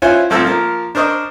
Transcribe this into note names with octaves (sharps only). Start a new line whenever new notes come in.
C#4 E4 F4 C5 F#5 G#5
A1 F3 C4 A4 E6
F3 A#3
D4 A#4 C5 D#5 C#6